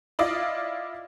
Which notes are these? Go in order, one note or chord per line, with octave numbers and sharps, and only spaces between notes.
E4 F4 D5 D#5 F5